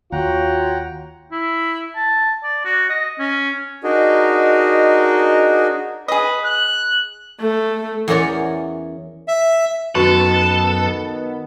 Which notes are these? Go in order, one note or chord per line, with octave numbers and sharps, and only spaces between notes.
D#2 F4 F#4 C#5 F#5 G5 A#5
E4
A5
D5
F#4
D#5
C#4
D4 D#4 F#4 G#4 A#4 D#5
G#4 B4 D#5
F#6
A3
E2 C#4 A#4 C#5 D5
E5
F#2 D#3 B3 F#4 A4 B4 C#6 A6